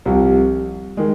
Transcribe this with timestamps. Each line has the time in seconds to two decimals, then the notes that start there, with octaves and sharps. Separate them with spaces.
0.06 C2 C3 F3
0.97 D#3 G#3